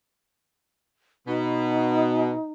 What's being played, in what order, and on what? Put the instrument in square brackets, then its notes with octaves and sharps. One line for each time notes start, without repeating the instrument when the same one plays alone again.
[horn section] B2 [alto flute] D#4